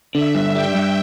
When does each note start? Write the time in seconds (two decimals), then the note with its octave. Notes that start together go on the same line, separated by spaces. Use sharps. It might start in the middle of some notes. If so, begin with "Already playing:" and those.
0.15 D3 E5
0.35 G2
0.55 G3 G5
0.75 G2